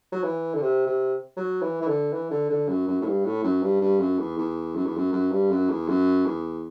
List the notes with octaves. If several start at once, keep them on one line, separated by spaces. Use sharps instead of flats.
F#3
E3
D3
C3
C3
F#3
E3
E3
D3
E3
D3
D3
F#2
F#2
A2
G2
A2
F#2
G2
G2
F#2
E2
E2
F#2
E2
F#2
F#2
G2
F#2
E2
F#2
E2